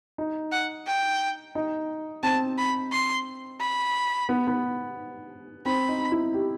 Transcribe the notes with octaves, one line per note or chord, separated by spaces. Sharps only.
D#4
F#5
G5
D#4
C4 A5
B5
C6
B5
B3
B3
C4 B5
D#4
E4
G4